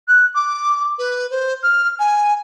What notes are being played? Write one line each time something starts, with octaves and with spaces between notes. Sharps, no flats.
F#6
D6
B4
C5
F6
G#5